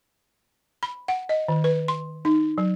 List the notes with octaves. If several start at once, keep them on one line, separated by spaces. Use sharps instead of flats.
B5
F#5
D#5
D#3
B4
C6
D#4
F#3